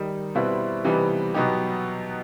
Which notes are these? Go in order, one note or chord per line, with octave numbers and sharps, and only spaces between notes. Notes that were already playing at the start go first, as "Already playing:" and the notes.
Already playing: D#3 G3 D#4
B2 G3 C4 E4 B4
C3 E3 G3 B3 D#4
B2 F#3 B3 D#4 G4